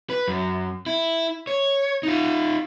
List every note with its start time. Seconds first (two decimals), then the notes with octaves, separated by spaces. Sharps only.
0.10 B4
0.28 F#2
0.86 E4
1.47 C#5
2.03 D#4 F4